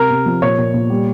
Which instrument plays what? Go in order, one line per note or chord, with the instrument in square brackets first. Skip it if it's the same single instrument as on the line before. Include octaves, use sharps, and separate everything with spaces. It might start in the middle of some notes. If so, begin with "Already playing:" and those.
Already playing: [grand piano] C3 [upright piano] A#4
[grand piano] C3
F3
[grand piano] A#2 [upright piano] C#5
[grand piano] A#2
A#2
G3